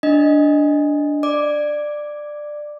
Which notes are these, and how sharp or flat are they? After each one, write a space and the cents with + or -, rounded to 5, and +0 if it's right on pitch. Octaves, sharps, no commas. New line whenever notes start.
D4 -5 D#5 +0
D5 +15 D6 +0